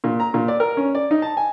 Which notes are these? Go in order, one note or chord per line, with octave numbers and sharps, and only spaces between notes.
A#2
A#5
A#2
D5
A#4
C#4
D5
D#4
A5
G#5